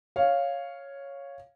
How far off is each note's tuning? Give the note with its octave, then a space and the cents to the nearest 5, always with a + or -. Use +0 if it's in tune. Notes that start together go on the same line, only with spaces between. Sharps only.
C#5 +0 F5 +0